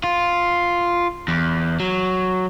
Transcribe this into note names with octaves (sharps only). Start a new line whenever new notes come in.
F4
E2
F#3